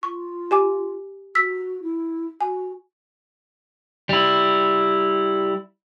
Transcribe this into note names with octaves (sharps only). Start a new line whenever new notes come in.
F4 C#6
G4 G#5 D6
F#4 E6 B6
E4
F#4 G#5
G3 E4